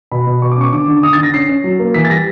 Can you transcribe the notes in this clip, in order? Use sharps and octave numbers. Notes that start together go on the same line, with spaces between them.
B2 B5
B2
B2 C#6
D6
C#4 C#6
D3 D6
D3
D6
D3 D#6
A6
D3 A#6
C#4 C7
C#4
F#3
A#3
E3 B6
A6
G3 A#6